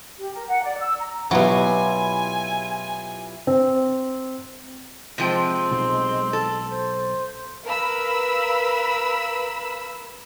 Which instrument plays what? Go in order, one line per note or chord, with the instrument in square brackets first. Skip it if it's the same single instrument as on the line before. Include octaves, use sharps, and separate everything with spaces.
[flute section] G4
A#4
F#5
D5
E6
A#5
[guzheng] B2 F#3 [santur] E4 F4 G4 [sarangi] G#5
[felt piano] C4
[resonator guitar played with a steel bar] C3 F3 G5 [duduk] G#3 [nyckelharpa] C4
[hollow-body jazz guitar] B1
[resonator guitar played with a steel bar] A4
[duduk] C5
[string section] A#4 B4 F5 B5 E6